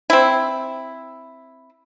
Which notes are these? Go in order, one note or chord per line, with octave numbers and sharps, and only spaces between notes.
C4 E4